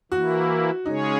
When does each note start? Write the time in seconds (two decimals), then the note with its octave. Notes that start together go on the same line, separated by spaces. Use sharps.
0.12 E3 A#3 E4 F#4
0.86 C#3 G#3 C#4 D#4 G#4 C#5